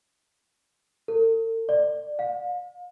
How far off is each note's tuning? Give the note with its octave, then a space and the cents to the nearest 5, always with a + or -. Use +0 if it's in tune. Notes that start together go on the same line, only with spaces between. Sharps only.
A4 +45
D5 +20
F5 +40